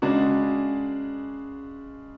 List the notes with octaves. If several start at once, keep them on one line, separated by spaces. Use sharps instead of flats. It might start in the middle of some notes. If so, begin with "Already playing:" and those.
C#3 G#3 D4 F#4